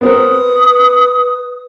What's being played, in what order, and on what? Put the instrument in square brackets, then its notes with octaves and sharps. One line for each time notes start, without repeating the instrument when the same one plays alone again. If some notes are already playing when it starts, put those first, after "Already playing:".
[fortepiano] B3 C4 A#4 [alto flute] B4 [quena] D#6